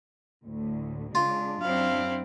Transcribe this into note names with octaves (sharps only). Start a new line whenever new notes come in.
D2 A2 D3
C#3 G#3 D4 F4
F#2 F#3 C4 D4 E4 F5